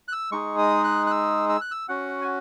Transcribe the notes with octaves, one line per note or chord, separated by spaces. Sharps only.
F#6
E6
G#3 D#4 G#4 C#6
D#6
F#6
F#6
E6
E6
F#6
E6
C#4 F#4 F#5
G#5